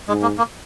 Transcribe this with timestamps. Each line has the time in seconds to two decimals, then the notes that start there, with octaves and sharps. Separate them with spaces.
0.08 G#2 G#3
0.22 A#3
0.38 A#3